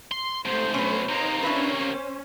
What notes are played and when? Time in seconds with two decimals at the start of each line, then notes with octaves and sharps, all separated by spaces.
0.12 C6
0.46 G#2 C3 A3 C5
0.74 B2 F#3 C#4 B4
1.09 C3 A#3 D#4 C5 A#5
1.43 C#4 D4 E4 B4
1.81 C5